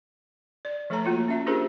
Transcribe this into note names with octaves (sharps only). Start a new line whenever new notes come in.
D5
F3 A3 A4 C#5 A5 A#5
A#3 F4 F#4
C#4 E5
D4 F4 G4 G#4 A#4 C5